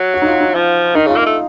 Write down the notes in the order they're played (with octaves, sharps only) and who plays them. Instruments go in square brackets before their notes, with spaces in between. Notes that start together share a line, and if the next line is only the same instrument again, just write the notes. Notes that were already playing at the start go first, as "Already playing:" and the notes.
Already playing: [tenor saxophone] F#3
[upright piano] F#4
D#4
F4
D#4
[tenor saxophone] F3
[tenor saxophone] D#3 [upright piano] D#4
[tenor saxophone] C#3 [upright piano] F4
[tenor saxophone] A#3 [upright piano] F5
[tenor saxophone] A3 [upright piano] D#5